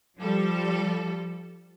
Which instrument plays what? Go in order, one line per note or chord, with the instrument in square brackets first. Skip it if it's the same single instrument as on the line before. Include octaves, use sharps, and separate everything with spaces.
[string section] F3 G3 A4